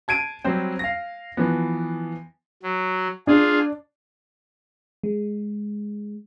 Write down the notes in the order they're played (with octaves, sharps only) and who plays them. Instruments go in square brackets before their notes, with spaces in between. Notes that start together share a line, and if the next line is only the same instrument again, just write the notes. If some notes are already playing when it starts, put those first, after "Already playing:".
[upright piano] A5 G#6 D7 D#7
F#3 G3 C4 C5
F5 A#6
E3 F3 B3
[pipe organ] F#3
[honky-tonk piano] D4 [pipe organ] F4 G#4
[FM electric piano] G#3